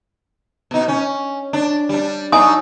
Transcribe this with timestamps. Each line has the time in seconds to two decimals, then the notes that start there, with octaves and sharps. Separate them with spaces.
0.71 B2 D#4
0.88 C#4
1.53 D4
1.89 G3 D4
2.32 F#3 D4 D#4 G#5 D#6